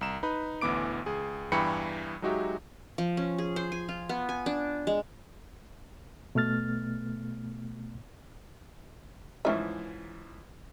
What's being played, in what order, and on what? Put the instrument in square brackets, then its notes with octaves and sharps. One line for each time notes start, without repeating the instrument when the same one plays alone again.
[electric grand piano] C2 A#5 E7
D#4 B4 B5
A1 D2 E3 B3 D6 D7
C#2 G#4
E2 G2 E3 G5 B5 C#7
F#3 G#3 D#4 F#4 G4 E5
[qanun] F3
C#4
G#4
C5
G#5
F4
B3
G#5
D4
G#3
[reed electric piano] B2 A3 B3 F6 A6
[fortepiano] G#2 E3 F3 [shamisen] C#4 E5